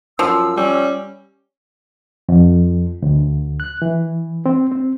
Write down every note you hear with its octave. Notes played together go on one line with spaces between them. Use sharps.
F#2 F3 E6
G3 C#4
F2
D2
F#6
E3
C4
C4